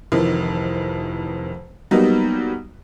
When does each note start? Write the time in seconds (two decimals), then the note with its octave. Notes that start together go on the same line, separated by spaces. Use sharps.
0.12 F1 F2 D#3 E3
1.91 F#3 G3 A#3 B3 D#4 G4